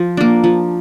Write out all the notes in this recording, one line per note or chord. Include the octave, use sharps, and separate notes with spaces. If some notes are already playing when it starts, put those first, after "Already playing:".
Already playing: F3
A#3 D4
F3